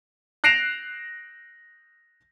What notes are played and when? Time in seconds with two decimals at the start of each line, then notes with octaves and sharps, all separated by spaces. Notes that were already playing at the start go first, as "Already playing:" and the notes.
0.44 F#6 A#6 C7 D7 E7 F7